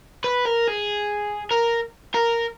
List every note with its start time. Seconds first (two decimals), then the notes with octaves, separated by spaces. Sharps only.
0.24 B4
0.45 A#4
0.67 G#4
1.51 A#4
2.14 A#4